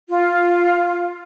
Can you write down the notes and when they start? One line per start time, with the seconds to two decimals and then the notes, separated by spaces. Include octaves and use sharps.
0.09 F4